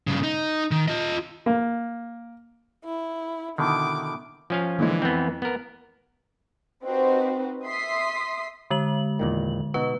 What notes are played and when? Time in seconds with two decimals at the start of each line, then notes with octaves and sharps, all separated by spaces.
0.07 G2 C#3
0.23 D#4
0.71 D#3
0.88 F4 D#5
1.46 A#3
2.85 E4
3.58 B2 D3 D#3 E4 D6
4.50 F3 C#4 F5
4.79 A#2 D3 E3 G#3
5.02 F2 B3 C4
5.42 B3 A#4
6.84 C4 D#4 F#4 G4 B4 C5
7.66 E5 C6 D#6 B6 C7
8.70 D3 G#3 F#7
9.19 E2 A#2 D#3
9.74 B2 D#4 F#4 B4